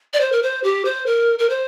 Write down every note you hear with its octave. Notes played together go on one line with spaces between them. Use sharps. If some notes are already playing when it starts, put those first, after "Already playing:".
D5
C5
A#4
C5
G4
C5
A#4
A#4
C5